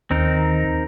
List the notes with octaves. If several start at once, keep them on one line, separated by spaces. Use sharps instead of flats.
D#2 D#3 C4 D#4 A#4